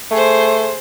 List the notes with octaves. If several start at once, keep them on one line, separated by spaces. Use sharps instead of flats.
A3 G#4 C5